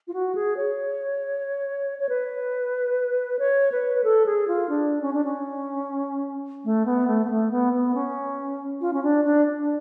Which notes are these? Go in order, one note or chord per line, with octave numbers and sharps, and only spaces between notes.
F4
F#4
G#4
C#5
C#5
B4
C#5
B4
B4
A4
G#4
F4
D4
C#4
D4
C#4
A3
B3
A3
B3
A3
B3
B3
C#4
F4
C#4
D4
D4
D4